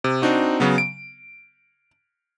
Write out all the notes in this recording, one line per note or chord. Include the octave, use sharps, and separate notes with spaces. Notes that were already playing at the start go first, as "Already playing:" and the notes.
C3
C4 D4 D#4 F#4
C#3 F#3 B3
D7